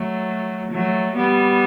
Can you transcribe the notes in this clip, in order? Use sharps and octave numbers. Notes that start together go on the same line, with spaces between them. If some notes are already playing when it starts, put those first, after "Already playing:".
Already playing: F#3 A3
F#3 A3
G3 B3